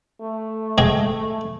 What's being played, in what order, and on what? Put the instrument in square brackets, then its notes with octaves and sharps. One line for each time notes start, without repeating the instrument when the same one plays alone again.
[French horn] A3
[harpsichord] G#3 G#4 G5